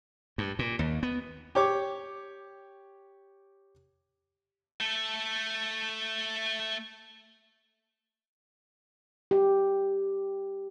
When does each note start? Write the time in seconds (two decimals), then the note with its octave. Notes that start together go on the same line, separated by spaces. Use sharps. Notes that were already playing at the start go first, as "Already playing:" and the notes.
0.38 G2
0.59 A#2
0.79 D#2
1.03 B3
1.55 G4 C#5 D6
4.80 A3 A4
9.31 G4